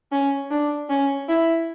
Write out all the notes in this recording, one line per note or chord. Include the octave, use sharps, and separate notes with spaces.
C#4
D4
C#4
E4